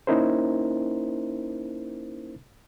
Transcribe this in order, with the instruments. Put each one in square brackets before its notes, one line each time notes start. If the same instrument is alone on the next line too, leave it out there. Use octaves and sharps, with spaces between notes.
[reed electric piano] A#3 C#4 D#4 E4 A#4 C5